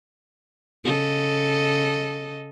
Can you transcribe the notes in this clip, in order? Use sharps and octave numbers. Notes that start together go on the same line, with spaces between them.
C#3 A4 D#5